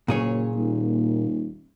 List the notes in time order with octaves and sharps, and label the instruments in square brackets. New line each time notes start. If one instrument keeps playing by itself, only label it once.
[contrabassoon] F#1 [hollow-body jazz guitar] A#2 G#4 C#5
[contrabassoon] D#1